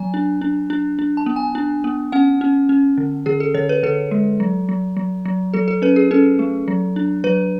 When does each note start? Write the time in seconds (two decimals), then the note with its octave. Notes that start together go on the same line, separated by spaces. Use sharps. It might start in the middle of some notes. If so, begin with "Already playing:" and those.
Already playing: F#3 G#5
0.14 D4
0.41 D4
0.70 D4
0.99 D4
1.17 A5
1.26 B3
1.36 G#5
1.55 D4
1.84 B3
2.12 C#4 F#5
2.41 C#4
2.69 C#4
2.98 D3
3.26 D3 G#4
3.40 A4
3.54 D3 C#5
3.69 B4
3.83 D3 A4
4.11 G#3
4.40 F#3
4.69 F#3
4.97 F#3
5.25 F#3
5.54 F#3 A4
5.68 A4
5.82 C#4 B4
5.96 G#4
6.11 C#4 A4
6.39 A3
6.68 F#3
6.96 D4
7.24 F#3 B4